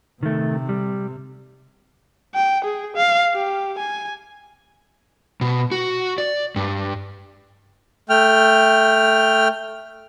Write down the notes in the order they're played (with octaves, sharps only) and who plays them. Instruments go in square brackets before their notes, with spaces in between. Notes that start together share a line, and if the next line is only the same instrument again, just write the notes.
[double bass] C3 [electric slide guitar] D#3 A3
[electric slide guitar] G3
[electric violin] G5
G#4
F5
G4
G#5
[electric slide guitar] B2
F#4
D5
G2
[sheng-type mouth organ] A3 G5 F6